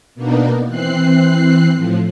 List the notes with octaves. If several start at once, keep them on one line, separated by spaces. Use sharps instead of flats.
B2 A#3 B3 D4 D#4
E3 C4 F#6 C7
A2 F3